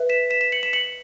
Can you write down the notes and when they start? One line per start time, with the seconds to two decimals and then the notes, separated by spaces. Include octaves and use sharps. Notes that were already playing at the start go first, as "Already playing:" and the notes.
Already playing: B4 E5
0.09 B6 E7
0.30 B6 E7
0.41 B6 E7
0.52 C#7 F#7
0.63 B6 E7
0.73 C#7 F#7